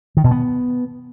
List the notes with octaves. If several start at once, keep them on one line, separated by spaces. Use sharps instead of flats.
D#3
B2
B3